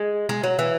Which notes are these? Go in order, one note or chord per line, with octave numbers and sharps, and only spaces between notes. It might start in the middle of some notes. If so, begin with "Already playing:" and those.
Already playing: G#3
G#3
F#3
E3